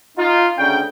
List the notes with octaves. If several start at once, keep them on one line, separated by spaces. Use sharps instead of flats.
D#4 F4
D2 C#3 C#4 D4 G5